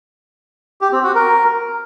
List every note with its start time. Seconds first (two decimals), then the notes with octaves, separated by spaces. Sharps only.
0.81 G4
0.92 C4
1.04 F#4
1.15 A#4